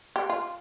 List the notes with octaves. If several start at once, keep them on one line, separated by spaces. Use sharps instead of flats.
G4
F4